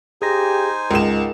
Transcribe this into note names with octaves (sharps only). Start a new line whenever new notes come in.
D#4 G4 G#4 C5 G#5 A#6
C#2 G#2 G#4 A#4 E7